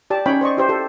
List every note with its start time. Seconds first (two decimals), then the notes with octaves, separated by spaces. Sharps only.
0.10 G4 D5 A5
0.26 C#4 D#4 C#5 G5 B5
0.41 C5 D5 D#5 C#6
0.57 E4 G4 C5
0.69 G4 A4